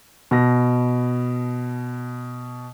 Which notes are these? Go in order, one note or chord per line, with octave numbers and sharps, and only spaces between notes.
B2 A#6